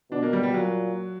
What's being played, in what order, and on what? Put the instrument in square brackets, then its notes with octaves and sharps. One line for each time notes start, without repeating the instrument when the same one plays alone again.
[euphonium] B2 [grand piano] D4
[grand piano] A#3
G3
G3
[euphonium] A#2 [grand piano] F#3